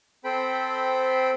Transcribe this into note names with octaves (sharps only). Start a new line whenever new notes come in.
C4 A4 C5 G5 B5